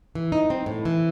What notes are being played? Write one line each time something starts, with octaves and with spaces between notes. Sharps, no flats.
E3
D#4
C4
A2
E3